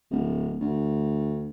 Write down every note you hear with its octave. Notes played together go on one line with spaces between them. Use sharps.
D1
D2